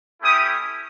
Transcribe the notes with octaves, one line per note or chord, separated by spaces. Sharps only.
A3 C#4 E4 G4 D#6